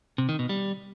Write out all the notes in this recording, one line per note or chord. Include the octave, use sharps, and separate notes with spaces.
C3
D#3
B2
G3